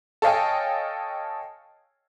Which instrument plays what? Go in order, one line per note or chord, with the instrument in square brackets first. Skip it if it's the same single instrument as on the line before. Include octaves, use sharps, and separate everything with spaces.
[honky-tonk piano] A4 C#5 D#5 F5 G5 G#5